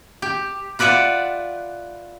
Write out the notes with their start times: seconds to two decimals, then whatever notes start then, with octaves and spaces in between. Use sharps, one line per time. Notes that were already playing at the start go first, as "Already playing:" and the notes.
0.22 G4
0.79 F4 B4 D5 E5 F#5